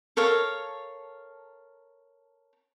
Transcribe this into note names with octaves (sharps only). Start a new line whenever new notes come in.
A4 A#4 C#5 F5